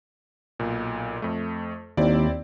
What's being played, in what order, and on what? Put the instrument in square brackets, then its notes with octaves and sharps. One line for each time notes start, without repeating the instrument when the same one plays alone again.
[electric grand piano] B1 A#2
F2 A3
[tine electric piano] D#2 [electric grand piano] C4 E4 D5